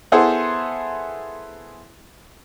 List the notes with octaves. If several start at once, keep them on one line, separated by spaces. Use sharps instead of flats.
B3 E4 G#4 A4 C5